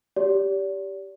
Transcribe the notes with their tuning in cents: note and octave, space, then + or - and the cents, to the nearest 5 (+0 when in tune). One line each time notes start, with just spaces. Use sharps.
G4 +0 D5 -40